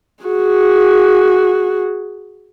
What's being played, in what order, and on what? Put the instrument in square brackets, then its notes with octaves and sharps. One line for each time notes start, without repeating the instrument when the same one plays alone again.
[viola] F#4 G#4